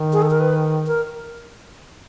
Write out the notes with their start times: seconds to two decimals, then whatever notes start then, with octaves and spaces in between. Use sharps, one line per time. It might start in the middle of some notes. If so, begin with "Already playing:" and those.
Already playing: D#3
0.13 G#4
0.22 A4
0.31 A#4
0.40 B4
0.87 A#4